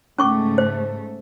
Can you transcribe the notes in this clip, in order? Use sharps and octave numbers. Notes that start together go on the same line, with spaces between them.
G#2 C#3 A3 C#4 C#6 D6
C5